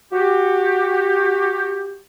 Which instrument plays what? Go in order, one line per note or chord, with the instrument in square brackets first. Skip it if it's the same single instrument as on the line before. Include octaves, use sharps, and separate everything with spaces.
[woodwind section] F#4 G4